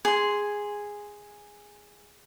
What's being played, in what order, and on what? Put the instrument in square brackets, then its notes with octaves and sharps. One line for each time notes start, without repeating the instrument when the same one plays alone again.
[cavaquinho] G#4 C6